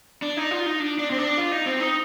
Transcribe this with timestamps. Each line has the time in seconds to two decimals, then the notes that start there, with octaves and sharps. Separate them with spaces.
0.22 D4
0.37 D#4
0.51 F4
0.66 D#4
0.80 D4
0.99 D4
1.11 C4
1.18 D4
1.38 F4
1.52 D#4
1.66 C4
1.80 D#4